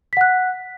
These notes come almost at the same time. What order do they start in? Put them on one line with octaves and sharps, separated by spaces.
B6 F#5 F#6